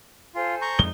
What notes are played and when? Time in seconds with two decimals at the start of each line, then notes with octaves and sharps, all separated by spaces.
0.35 F4 A4 C5 G#5
0.62 A#5 C#6 G6
0.79 F2 G#3 D#4 G7